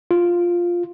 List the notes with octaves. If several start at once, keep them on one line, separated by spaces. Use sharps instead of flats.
F4